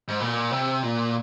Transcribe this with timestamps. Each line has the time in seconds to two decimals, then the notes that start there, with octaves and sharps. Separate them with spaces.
0.08 G#2
0.20 A#2
0.51 C3
0.83 A#2